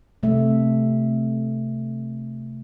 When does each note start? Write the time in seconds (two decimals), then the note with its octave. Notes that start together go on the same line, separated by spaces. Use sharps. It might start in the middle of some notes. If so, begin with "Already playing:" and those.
0.23 C3 A3 E5